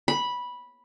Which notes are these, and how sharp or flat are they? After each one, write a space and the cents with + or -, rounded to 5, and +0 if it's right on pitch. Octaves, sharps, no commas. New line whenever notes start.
B5 -10